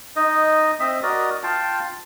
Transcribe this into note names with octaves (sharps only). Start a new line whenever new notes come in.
D#4 D#5
C4 D#5 E5
F#4 A#4 D5 D#5
F4 F5 G5 A5